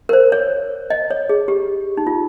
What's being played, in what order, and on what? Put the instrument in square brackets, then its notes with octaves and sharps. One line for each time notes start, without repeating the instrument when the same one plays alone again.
[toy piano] A#4
C5
C#5
D#5
C#5
G#4
G4
D#4
F4